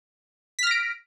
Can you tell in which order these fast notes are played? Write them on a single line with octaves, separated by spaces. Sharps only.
B6 F6 A#6 D7